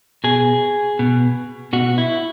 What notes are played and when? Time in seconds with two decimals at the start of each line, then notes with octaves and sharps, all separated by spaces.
0.24 B2 G#4
0.99 B2
1.73 B2 F#4
1.98 E4